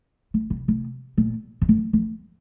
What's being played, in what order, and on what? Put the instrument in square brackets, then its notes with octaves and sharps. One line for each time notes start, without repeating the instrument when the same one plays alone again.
[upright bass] C#3
C3
C3
A#2
F2
F#2
F2